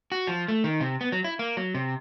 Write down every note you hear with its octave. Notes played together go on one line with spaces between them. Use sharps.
F#4
F3
A3
D#3
C3
B3
F#3
E4
A#3
F#3
C3